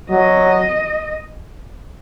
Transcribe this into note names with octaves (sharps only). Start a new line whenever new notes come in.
F#3 D#5